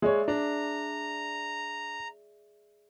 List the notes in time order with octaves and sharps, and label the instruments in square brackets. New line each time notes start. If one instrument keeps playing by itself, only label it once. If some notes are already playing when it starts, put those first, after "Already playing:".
[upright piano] G#3 C#5 [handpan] G#4 D5 E5
[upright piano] D4 [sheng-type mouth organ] A#5